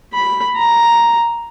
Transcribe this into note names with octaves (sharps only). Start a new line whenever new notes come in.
B5
A#5